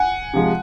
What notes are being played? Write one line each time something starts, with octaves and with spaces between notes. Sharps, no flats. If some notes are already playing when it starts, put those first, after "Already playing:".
Already playing: F#5 G#5
C3 F3 G#3